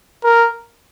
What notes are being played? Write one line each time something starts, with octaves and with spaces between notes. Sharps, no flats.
A#4